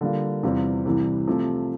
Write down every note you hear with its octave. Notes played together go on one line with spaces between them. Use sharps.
D3 G3 A#3 F4
E2 C3 G3 C4 F4
C2 C3 E3 G3
C3 F3 A3